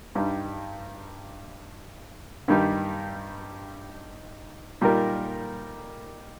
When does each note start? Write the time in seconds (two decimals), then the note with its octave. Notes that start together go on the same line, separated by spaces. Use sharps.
0.15 G2 G3 D#4
2.48 G2 D#3 G3 D#4
4.81 A#2 G3 D#4 A#4